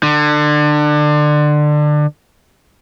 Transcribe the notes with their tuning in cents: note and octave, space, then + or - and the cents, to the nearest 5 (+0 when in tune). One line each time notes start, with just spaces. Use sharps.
D3 +25